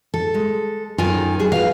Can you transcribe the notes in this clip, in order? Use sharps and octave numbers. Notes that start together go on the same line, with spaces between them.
A4
G#3
F#2 D#3 F4 G#5
F#3 G#4
F4 F#4 B4 F5